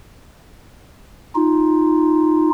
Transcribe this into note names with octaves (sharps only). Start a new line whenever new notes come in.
D#4 F4